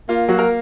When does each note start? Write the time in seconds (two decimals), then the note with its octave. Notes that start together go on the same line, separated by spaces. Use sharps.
0.09 A#3 F4
0.28 F#3 F#4
0.39 A#4